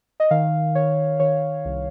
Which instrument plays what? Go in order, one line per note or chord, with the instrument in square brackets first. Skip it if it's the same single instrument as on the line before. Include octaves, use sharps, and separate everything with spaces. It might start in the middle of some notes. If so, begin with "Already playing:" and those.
[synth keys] D#5
D#3 F5
D#3 C#5
D#3 C#5
C2